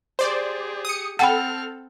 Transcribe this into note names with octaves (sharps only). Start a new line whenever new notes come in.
G4 G#4 C5 D5
D#6 C#7
C4 A4 F#5 G5 B5 F6